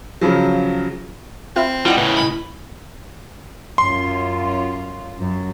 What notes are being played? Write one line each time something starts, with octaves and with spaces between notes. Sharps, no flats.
C#3 F3 F#3
C4 F4 E5 B5
G3 E4 F4 D#5 F#5 G5
A2 C#3 B4
B5
F#2 F4 C6
F#2